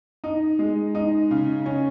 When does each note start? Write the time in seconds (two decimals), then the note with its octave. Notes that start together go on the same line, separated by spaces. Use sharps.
0.24 D#4
0.59 G#3
0.95 D#4
1.31 C#3
1.66 C#4